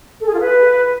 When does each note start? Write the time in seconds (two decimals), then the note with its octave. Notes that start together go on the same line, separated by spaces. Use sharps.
0.20 A4
0.27 G#4
0.33 F4
0.40 B4